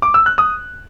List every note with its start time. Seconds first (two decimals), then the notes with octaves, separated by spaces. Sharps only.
0.02 D6
0.14 E6
0.26 F#6
0.38 D#6